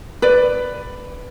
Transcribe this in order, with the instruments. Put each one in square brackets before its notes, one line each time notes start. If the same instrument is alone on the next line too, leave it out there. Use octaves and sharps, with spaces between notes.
[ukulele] B4 D5